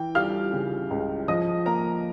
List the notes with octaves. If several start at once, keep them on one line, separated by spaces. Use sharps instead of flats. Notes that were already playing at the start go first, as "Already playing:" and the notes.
Already playing: E3 G5
G3 F5 F6
C#3
C#2
F3 D#5 D#6
A#3 A#4 A#5